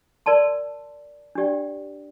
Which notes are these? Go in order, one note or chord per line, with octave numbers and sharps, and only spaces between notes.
A#4 D5 A5 C6
D4 G4 D5 G5